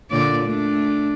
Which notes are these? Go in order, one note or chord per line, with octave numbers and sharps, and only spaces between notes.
A#2 D3 D5
A3 D4